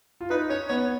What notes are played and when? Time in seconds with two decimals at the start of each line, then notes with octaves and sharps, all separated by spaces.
0.21 F4
0.30 D#4 B4
0.50 C#4 C#5
0.69 B3 C#5